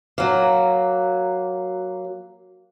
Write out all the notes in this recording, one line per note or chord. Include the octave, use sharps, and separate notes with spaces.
F#3 A#3